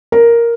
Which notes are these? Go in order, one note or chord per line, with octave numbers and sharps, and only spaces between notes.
A#4